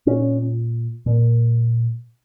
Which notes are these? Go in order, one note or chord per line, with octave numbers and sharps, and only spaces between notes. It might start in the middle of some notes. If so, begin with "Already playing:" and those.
A#2 C#4
A#2